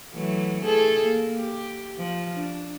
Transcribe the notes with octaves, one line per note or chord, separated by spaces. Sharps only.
E3 F#3 A3
A3 G#4 A4
A#3
G4
F3
D4